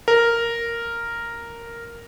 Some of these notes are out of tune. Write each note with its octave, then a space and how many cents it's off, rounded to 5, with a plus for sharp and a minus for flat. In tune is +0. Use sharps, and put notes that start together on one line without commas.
A#4 -5